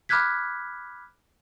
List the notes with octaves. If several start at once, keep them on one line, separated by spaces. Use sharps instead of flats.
B5 D6 F6 F#6 G#6 B6